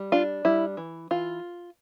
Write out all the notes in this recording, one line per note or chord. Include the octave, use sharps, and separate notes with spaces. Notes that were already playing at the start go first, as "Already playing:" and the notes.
Already playing: G3
D4 F4
G3 E4
E3
E3 F4